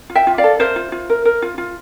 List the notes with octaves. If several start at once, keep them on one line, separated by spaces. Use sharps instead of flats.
F4
E5 G5
F4
D5 F5
A4
A#4 C5 E5
F4
F4
A#4
A#4
F4
F4